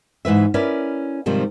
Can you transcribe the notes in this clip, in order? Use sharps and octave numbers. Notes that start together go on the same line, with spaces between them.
G#2 E3 B4 E5
C#4 E4 A#4 B4 D5
G#2 C3 D#3 F3 G3